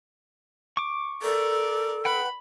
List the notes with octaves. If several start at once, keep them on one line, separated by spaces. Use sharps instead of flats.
C#6 D6
A4 A#4 D5
B4 F#5 G5 B5